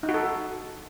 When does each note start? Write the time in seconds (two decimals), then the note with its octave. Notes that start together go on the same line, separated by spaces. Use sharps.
0.03 D#4
0.09 F#4
0.14 A4